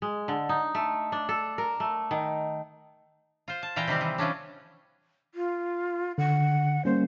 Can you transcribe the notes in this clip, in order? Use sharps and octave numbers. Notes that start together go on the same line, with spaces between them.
G#3
D3
D#4
A3
D4
A4
A#4
A3
D#3
F4 C5
A5
A#2 E3 F5 G5 A#5
C3 D#3 G3 C4
E3
E3 F3 C#4 D4
F4
D3 F#5
G3 A#3 C#4 C5